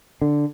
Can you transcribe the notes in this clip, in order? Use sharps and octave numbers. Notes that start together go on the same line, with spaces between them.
D3